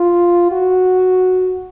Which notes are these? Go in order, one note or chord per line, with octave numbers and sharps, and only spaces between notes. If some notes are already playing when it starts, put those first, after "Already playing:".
Already playing: F4
F#4